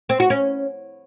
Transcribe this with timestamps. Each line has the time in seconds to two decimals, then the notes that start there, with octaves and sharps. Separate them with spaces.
0.09 C4
0.20 F#4
0.30 C#4